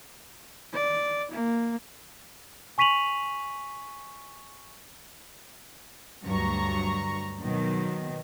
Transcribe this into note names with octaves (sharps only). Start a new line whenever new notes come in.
D5
A#3
G#5 C#6 B6 D#7 F7 F#7
D2 G2 F#3 A#5 C#6
B2 D#3 F#3